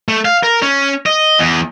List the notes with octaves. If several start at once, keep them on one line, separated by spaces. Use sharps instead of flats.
A3
F5
A#4
C#4
D#5
E2